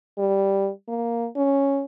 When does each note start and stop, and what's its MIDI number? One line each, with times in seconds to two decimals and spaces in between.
0.18 0.70 55
0.88 1.28 58
1.36 1.84 61